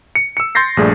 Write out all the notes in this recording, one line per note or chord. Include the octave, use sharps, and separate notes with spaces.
C#7
E6 C#7
C6 G6 A6 A#6 C7
A#1 G2 A3 G#4 D5